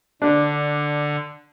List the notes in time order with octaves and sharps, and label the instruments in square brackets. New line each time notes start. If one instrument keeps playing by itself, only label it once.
[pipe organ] D3 [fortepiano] D4